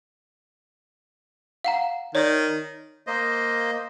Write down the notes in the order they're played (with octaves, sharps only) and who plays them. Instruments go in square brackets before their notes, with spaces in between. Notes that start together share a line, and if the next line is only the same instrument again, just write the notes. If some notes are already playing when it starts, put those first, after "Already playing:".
[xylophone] F5 F#5 A#5
[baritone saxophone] D#3 [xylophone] C#5 D5
[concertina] A#3 C5 D#5